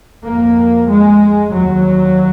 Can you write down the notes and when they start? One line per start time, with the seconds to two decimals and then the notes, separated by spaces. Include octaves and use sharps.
0.24 F2 A#3
0.88 G#3
1.52 D#2 F#3